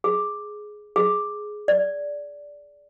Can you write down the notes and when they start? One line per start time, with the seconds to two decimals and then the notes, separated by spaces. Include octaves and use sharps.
0.04 G#4
0.96 G#4
1.68 D5